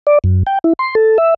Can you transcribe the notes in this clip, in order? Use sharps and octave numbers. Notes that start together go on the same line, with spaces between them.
D5
F#2
G5
E4
C6
A4
E5